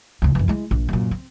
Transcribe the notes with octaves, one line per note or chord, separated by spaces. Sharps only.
D2 C#3
F#2 E3
G#3 E4
A#1
F#2 A#2
C4